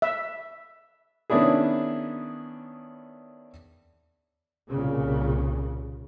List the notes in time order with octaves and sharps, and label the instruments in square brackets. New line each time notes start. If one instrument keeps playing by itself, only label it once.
[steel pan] E5
[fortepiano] D#3 B3 C#4 D4 E4 G#4
[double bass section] C2 A#2 C#3